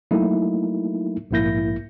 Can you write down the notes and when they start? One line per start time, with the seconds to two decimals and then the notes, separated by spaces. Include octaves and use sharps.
0.11 F#3 A3 A#3 D#4 E4
1.31 A#1 G#2 A#3 E4 G6 A#6